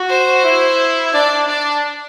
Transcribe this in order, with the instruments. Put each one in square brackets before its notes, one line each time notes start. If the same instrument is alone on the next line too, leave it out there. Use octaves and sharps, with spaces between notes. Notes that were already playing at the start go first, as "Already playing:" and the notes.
Already playing: [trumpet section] F#4
[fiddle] C5
[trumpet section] E4
[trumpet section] D4 [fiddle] D5
[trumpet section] D4 [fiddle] D5